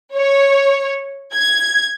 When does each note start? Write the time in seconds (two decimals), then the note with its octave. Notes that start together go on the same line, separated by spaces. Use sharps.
0.14 C#5
1.33 G#6